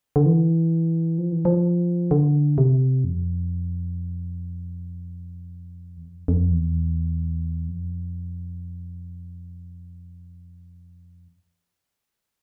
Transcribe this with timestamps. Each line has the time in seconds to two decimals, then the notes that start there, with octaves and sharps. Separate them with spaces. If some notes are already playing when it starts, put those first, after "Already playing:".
0.16 D3
0.26 E3
1.18 F3
1.32 E3
1.45 F3
2.11 D3
2.58 C3
3.04 F2
5.97 E2
6.06 F2
6.28 F2
6.51 E2
7.68 F2